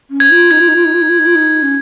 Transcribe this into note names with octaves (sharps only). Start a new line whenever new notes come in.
C#4
G#6
F4
D#4 G#6
F4
D#4
F4
D#4
F4
D#4
F4
D#4
F4
D#4
C#4